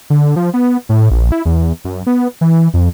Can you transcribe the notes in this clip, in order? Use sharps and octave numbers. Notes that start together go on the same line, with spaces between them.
D3
F3
B3
A2
A#1
E4
E2
F#2
B3
E3
F2